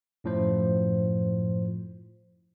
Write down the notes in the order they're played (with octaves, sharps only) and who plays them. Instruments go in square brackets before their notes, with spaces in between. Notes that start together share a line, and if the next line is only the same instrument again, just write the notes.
[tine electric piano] F#2 A2 F3 C5